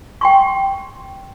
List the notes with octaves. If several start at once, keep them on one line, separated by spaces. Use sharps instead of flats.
G5 C6 C#6